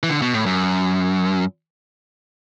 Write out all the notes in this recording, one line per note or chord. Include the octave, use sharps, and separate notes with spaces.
E3
D3
B2
A2
F#2